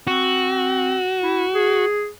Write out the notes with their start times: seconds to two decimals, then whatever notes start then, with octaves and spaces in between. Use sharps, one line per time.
0.07 C4 F#4
1.23 E4
1.54 G#4